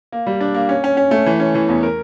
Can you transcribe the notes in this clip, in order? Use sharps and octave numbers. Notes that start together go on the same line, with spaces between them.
A#3
G3
D4
A#3
C#4
C#4
C#4
A3
E3
C#4
E3
E2
A#4